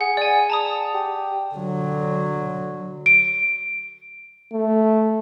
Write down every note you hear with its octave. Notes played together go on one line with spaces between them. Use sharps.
G#4 F#5
D5 G#5
A5 A#5 D#6
G4
D3 F#3
D7
A3